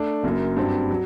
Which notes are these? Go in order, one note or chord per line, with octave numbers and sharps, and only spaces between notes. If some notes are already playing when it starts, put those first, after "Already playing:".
Already playing: A3 D4
F#1 F#2 F#3 A#3
G2 F#3 C4
F#3